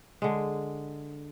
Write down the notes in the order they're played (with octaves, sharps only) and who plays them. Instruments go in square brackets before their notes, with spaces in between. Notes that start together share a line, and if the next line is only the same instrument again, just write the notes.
[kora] D3 G#3